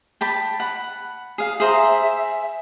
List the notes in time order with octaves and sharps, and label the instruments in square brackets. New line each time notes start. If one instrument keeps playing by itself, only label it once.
[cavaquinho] G5 A5 B5
F#5 B5
G#4 F5
[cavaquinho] G#4 C5 A#5 [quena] E5